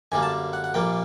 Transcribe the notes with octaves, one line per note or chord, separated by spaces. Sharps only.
F#2 D3 G3 A#3 G#5
A5
F#5
F#5
A#1 A#2 G3 A#3 G5